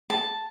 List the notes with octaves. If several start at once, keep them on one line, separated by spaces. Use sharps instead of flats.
A5